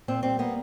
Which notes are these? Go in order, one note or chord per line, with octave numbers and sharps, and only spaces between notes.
A#2 C4
G3 C4
A#3 B3